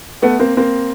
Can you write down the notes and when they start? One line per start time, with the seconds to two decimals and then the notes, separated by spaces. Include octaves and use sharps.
0.22 A3 B3
0.40 A#3 C4
0.57 A#3 C4